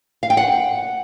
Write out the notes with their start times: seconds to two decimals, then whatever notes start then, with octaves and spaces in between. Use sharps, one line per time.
0.23 F5
0.30 G5
0.37 F#5